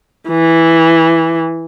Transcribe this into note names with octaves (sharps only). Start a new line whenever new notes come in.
E3